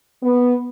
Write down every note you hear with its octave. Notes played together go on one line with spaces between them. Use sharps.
B3